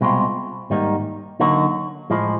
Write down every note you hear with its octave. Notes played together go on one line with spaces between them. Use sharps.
C2 B2 G#3 C4 F4
G#2 D#3 G3 A#3 D#4
D3 F#3 A#3 D#4 F#4
A2 F3 G#3